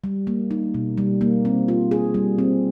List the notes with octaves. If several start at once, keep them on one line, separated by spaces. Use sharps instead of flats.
G3
A#3
D#4
B2
G3
A#3
C4
F4
G#4
G3
C4